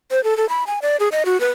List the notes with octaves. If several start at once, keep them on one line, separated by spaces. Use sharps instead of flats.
C5
A4
A4
B5
G#5
D5
G#4
D#5
F#4
B4